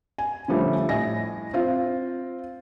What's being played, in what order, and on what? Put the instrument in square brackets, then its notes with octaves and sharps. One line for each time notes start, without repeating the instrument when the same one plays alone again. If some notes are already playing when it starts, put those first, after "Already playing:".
[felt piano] G#5
D3 F3 G3 A3 C#4
A2 D#5 G#5 A#6
C4 F4